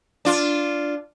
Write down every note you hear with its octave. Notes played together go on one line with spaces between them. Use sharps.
D4 F4